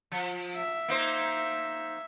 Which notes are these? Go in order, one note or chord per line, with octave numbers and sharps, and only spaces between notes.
F3
E5
A#3 D#4 C5